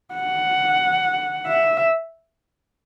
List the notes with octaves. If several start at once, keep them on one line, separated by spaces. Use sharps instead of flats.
F#5
E5